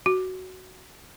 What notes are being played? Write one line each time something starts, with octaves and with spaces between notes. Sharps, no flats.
F#4